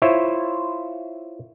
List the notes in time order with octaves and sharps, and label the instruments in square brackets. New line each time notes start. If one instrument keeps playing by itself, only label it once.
[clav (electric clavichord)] E4 F4 C5 C#5 E5